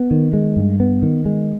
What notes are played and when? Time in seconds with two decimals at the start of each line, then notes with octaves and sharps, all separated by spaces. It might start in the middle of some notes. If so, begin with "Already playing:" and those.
Already playing: B3
0.11 D#3
0.33 G#3
0.56 G2
0.80 B3
1.02 D#3
1.26 G#3